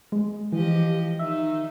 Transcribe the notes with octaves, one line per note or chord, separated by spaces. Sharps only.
G#3
E3 F3 G4 D#5
D#3 D#4 E5